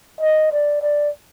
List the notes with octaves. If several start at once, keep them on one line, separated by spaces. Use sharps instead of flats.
D#5
D5
D5